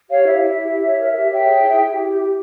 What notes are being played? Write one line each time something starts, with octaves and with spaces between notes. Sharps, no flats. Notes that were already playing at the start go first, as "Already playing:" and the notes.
G4 C#5 F5
E4 E5
E4 E5
G4
G4
C#5
A#4 E5
G4 E5
C#5 E5 G5
G#4
E4
E4
G4
G4
G4